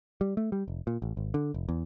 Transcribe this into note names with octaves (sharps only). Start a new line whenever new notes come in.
G3
A3
G3
F1
A#2
A1
G#1
D3
F1
E2